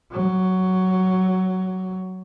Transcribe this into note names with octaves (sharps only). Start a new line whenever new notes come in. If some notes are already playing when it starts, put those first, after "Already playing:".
F#3